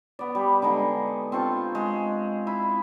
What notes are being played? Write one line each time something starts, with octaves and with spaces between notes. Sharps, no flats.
B3 D5
G3
D3 G#3 D#4
C4 F4 A4 C#6
G#3
E4